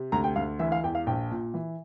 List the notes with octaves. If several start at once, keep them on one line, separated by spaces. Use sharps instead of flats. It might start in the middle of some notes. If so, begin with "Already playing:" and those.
Already playing: C3
D2 A#5
G5
D2 F5
E3 E5
F5
E2 G5
F5
A#1 G5
A#2
E3